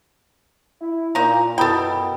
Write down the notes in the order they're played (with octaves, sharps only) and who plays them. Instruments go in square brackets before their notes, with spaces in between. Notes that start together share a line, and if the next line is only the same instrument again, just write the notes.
[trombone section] E4
[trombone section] A#2 [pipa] D#4 A#5
[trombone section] F#2 B2 [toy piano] E4 B5 D#6 [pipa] A4 G5